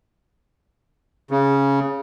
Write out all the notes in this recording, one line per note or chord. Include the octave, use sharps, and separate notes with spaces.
C#3